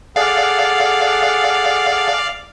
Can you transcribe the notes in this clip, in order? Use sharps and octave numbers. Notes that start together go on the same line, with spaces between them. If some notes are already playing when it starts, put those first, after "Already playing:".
G#4 A4 D5 F5 F#5